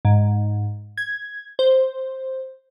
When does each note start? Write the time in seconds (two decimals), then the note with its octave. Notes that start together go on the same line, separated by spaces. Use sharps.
0.05 G#2
0.98 G#6
1.59 C5